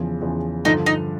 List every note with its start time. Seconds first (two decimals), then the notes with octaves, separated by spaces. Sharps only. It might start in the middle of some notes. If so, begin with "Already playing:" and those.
Already playing: E2 C#3 F3
0.21 E2 C#3 F3
0.65 G2 D3 F3 D#4
0.86 D#4